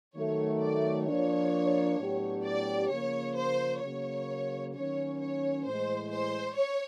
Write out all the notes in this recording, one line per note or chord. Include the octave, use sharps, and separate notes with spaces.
D#3 F#3 A3 C#5
D5
F3 A#3 D4 C#5
A2 F#3 B3 D4 G4
D5
C#3 F3 A#3 C#5
C5
C#3 F#3 A#3 C#5
D#3 F#3 A#3 C#4 C#5
C#5
A2 E3 G#3 C5
C5
C#5